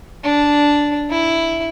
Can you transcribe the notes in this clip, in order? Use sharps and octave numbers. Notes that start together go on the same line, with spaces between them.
D4
E4